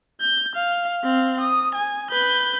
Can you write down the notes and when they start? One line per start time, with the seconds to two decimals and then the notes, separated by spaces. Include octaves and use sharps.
0.21 G6
0.55 F5
1.03 C4 F5
1.40 D#6
1.75 G#5
2.11 B4 G6